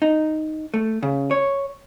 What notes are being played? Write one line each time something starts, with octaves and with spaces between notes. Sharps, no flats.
D#4
A3
C#3
C#5